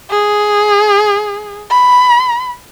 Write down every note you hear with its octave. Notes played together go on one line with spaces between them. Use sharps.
G#4
B5